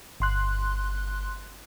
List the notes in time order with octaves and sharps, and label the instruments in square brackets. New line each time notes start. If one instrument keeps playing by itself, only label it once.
[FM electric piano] G1 C6 F#6